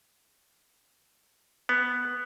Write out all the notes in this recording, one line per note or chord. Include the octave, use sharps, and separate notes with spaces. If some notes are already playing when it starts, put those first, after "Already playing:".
B3